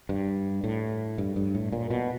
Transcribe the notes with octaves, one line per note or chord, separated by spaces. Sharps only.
G2
A2
G2
G2
A2
A#2
B2